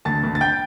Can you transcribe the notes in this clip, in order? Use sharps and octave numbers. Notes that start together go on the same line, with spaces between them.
D2 A5 A6
D2
A6
G5 G6